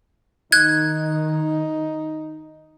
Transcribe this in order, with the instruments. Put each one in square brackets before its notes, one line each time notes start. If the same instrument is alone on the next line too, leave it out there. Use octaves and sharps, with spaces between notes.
[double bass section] D#3 [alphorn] D#4 [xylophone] F#6 G#6